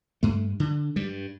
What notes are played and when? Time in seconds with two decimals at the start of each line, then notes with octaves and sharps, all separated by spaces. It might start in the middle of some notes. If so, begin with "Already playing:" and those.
0.23 G2 A3
0.60 D3
0.96 G2 G3